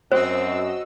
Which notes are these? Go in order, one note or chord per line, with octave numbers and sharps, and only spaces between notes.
F#2 C4 F#4 C5 D#5 E6